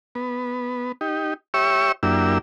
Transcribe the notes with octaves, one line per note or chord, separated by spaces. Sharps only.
B3
D#4 G4
G4 C#5 E5 C#6 E6
F#2 A#3 D4 E4 G4 E6